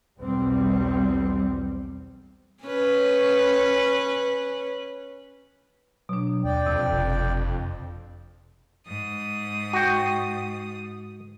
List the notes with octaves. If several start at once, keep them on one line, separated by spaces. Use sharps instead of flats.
B1 E2 G3 C4
C#4 B4
B2 F#3 D4
D#2 D5 G5
F2 C3
F#1
G#2 D#6
F#4 G5